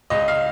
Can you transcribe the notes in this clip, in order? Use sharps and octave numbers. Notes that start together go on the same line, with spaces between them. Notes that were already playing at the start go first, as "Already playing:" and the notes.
C#2 D#5
F5